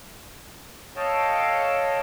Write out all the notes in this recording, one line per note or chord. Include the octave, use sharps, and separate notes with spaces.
A4 C#5 D#5 F5 G5 A5